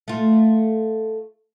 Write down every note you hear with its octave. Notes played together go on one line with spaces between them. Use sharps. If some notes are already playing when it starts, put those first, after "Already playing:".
A3 F4